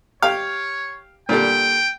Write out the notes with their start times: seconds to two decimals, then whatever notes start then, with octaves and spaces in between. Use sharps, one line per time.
0.22 G4 C#5 F5
1.29 A#2 D3 G3 G5